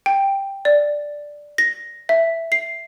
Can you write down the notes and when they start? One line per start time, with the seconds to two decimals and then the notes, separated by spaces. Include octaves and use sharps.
0.06 G5
0.65 D5
1.58 A#6
2.09 E5
2.52 C7